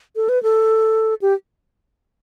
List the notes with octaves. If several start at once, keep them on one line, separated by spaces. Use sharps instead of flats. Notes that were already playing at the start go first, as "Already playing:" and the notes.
A4
B4
A4
G4